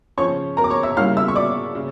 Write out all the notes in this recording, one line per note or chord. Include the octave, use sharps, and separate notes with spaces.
C#3 F3 C#4 C#5 C#6
A#4 A#5
D6
C#5 C#6
E5 E6
C#3 G3 A#3 C#4 E4 F5 F6
E5 E6
C#6
D5 D6
C#3